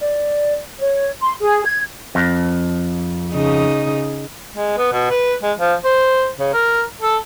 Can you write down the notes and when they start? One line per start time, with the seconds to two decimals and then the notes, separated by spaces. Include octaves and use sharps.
0.01 D5
0.80 C#5
1.21 C6
1.41 G#4
1.65 G#6
2.15 F2
3.33 C#3 D#4
4.54 G#3
4.77 B3
4.92 B2
5.10 B4
5.43 G#3
5.58 F3
5.84 C5
6.38 C#3
6.53 A#4
7.01 A4